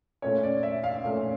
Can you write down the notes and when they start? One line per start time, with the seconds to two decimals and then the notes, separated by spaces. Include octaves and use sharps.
0.22 A#2 A3 C#4 C#5
0.43 D5
0.63 E5
0.84 F5
1.04 A#2 A3 C#4